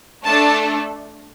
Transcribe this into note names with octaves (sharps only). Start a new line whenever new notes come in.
A3 D4 A4 A5